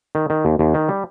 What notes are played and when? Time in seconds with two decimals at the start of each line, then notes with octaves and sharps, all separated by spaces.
0.15 D#3
0.30 D#3
0.45 D#2
0.59 D#2
0.74 D#3
0.89 G3